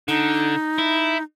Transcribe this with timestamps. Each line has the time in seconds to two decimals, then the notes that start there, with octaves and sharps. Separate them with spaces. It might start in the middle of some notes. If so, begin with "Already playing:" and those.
0.08 D3 D#4
0.78 E4